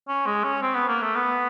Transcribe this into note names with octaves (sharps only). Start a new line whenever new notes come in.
C#4
G#3
C#4
C4
B3
A#3
A3
B3